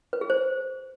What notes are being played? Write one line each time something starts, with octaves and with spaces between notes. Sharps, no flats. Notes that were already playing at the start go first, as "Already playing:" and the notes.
B4
G#4
C5